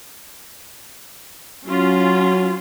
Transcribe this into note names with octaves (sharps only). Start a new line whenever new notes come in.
F#3 C#4 F4